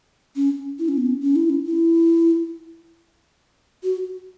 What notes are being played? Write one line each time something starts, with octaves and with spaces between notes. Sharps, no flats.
C#4
E4
C#4
B3
C#4
C#4
E4
C#4
E4
F#4